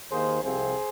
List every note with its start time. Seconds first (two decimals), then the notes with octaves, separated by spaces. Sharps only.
0.10 D#2 D#3 A#3 G#4 C5
0.42 C2 C3 F3 C4 G#4 C5